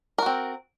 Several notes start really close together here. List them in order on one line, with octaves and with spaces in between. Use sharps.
A#4 F#4 C4